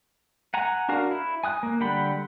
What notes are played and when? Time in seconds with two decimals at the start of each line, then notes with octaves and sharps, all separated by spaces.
0.54 F#5 G#5 A#5
0.89 D4 F#4 A#4 F5
1.11 E4
1.44 G#5 D#6 F#6
1.63 A#3
1.80 D3 G3 F#5 G5 B5